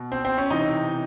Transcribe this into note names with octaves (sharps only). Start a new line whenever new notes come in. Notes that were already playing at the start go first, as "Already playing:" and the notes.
Already playing: B2
C4
C4
C#4
C3 E3 D#4